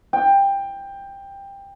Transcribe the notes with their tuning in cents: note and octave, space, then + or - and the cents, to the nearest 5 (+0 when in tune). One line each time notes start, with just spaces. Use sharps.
G5 +15